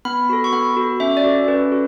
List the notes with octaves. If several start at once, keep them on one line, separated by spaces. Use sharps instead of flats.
B3 B5
F#4 A4
C#6
B3 B5
F#4 A4
C#4 E5
D5
F#4 A4
C#4 B4
F#4 A4